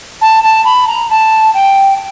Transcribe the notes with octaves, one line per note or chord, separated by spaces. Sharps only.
A5
A5
B5
A#5
A5
G5